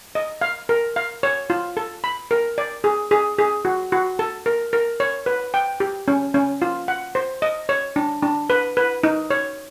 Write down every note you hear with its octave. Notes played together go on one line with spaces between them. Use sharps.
D#5
F5
A#4
F5
C#5
F4
A4
B5
A#4
D5
G#4
G#4
G#4
F#4
F#4
A4
A#4
A#4
C#5
B4
G5
G4
C#4
C#4
F4
F#5
C5
D#5
C#5
D4
D4
B4
B4
D#4
C#5